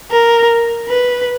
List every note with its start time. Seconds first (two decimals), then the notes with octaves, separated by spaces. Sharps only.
0.11 A#4
0.89 B4